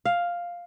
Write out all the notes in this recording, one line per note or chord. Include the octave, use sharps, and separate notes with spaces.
F5